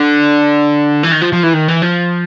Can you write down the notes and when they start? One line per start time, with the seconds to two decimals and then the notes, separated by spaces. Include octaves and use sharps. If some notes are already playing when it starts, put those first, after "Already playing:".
Already playing: D3
1.03 E3
1.12 D#3
1.22 F3
1.33 F3
1.43 E3
1.53 D#3
1.68 E3
1.82 F3